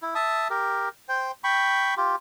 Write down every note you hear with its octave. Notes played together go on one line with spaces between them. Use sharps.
E4
E5 A5 D#6
G4 A#4
C5 G5
G5 B5 C#6
F4 G4